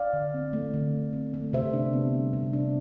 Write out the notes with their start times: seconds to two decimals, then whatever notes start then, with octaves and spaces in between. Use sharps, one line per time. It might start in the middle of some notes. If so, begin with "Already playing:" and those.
Already playing: D5 F5
0.13 D3
0.34 C4
0.53 A3
0.74 D3
0.94 D3
1.13 C4
1.34 A3
1.53 C3 C5 E5
1.73 D4
1.93 B3
2.14 G3
2.33 C3
2.53 D4